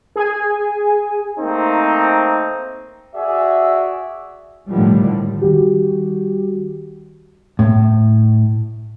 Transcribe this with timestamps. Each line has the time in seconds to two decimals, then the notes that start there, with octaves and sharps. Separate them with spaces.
0.16 G#4 G#5
1.39 A3 A#3 C4 D#4
3.15 F#4 G#4 D5 E5
4.68 A2 D3 D#3 F3 G3
5.41 D#3 G3 F#4 G4
7.59 A2